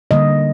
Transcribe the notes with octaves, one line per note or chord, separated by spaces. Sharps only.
D3 G3 A#3 D#5